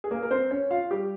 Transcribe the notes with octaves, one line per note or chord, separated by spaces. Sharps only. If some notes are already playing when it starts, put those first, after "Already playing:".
G#4
A#3 A#4
A#4
C4 C5
C#4 C#5
F4 F5
G3 G4